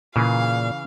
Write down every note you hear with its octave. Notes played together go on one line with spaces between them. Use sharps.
A#2 C#3 E3 G#4 F5